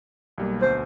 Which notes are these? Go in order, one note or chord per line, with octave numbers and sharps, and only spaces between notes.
B1 G3 A#3
D2 B2 C5